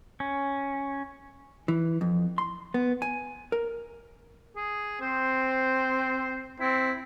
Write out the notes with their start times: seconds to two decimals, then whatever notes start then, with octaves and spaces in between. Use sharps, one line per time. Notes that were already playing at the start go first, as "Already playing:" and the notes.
0.20 C#4
1.68 E3
2.01 F2
2.38 C6
2.74 B3
3.02 G#5
3.52 A#4
4.56 G#4
5.01 C4 C5
6.60 C4 E4